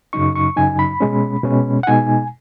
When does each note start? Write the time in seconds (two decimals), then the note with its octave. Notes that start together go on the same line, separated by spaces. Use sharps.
0.13 F#2 C#3 F#3 D#4 C#6
0.36 C#6
0.57 F#2 C#3 F#3 D#4 G#5
0.79 B5
1.00 B2 G#3 C#4
1.44 B2 G#3 C#4
1.83 F#5
1.87 B2 G#3 D#4 G#5